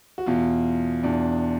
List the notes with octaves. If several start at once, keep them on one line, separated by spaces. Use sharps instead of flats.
F#4
E2 B2 F4
E2 B2 D4